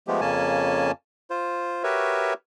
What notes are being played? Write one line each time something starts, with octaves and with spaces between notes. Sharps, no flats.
F3 G#3 A3 B3 G4
F2 C#3 A#3 C#4 G#5 A5
F4 C5
F#4 G4 A#4 B4 C#5 E5